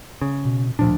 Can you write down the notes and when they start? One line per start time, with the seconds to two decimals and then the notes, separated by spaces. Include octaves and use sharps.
0.21 C#3
0.45 B2
0.79 D2 A#2 F3 D4